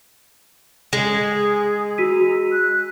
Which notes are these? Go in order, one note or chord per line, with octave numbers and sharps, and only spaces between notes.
G#3 G#4
F#4 A#5 E6 B6 D#7
F#6